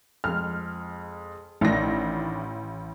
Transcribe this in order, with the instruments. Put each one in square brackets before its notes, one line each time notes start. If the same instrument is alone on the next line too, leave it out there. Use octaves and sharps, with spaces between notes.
[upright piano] F2 G#3 [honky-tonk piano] F6
[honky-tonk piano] A1 A#6 [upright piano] D#3 D4 E4